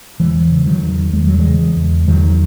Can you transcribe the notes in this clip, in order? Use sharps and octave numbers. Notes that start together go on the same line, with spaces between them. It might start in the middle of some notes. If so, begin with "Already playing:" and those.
E2 E3 G#3
C#3
D#3 F#3
E2
E2 G#3
F#3
E3 G#3
C#3
E2
E2 D#3 F#3